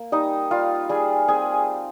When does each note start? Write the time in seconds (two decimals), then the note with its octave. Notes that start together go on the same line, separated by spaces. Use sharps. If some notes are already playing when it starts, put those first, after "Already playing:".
Already playing: A#3
0.12 G3 D#4 D#5
0.51 G3 F4 F5
0.89 G3 G#4 G#5
1.28 C4 G#4 G#5